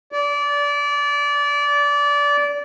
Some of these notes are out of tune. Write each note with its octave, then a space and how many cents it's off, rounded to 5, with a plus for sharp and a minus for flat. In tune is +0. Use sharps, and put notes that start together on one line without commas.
D5 -25